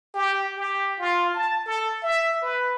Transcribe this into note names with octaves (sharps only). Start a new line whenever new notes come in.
G4
G4
F4
A5
A4
E5
B4